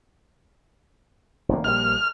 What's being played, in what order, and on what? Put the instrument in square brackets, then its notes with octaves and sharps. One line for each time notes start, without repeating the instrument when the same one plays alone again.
[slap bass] F1 D#3 A#3
[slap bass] A#1 G3 A#3 [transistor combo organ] F6